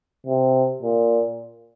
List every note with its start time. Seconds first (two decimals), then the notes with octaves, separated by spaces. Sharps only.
0.27 C3
0.82 A#2